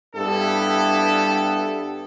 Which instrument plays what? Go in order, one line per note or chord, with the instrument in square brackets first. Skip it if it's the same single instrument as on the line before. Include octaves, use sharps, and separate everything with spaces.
[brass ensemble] G2 B3 E4 G4 A4